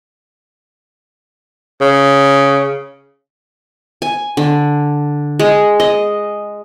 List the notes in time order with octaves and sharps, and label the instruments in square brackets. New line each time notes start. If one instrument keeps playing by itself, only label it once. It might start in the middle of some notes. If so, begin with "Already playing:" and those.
[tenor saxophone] C#3
[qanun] G#5
D3
G#3
D#5